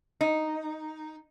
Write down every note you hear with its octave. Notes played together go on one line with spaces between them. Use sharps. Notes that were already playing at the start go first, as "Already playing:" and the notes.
D#4